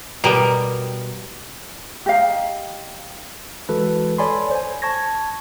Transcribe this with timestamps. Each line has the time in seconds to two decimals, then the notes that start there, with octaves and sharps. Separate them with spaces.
0.24 B2 G3 B3 G4 A#4
2.06 G4 D#5 F5 A#5
3.69 E3 G#3 F#4 A4 B4
4.18 A4 C#5 D5 G#5 B5 C6
4.51 C5 G#5
4.82 A5 C#6 G#6 A#6